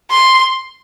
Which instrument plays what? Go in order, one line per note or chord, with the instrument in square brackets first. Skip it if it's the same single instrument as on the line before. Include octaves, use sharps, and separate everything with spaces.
[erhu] C6